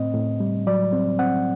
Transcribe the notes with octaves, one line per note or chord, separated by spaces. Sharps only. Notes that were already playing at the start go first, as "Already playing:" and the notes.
Already playing: A2 C4 D#5
A2
G3
F#3 D5
C4
C4 F#5